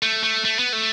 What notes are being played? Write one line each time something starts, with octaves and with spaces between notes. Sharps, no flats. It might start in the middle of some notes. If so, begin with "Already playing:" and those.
A3
A3
A3
B3
A3